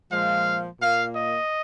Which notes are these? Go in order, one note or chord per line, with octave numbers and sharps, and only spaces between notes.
A#2 F3 G#3 F5
A#2 A#3 F5
D#5